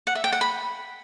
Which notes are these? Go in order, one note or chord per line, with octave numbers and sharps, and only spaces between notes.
F#5
E5
G5
F#5
B5